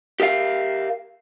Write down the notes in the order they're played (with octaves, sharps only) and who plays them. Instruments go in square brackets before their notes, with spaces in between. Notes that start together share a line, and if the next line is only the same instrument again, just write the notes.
[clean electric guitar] G4 A#4 E5 F5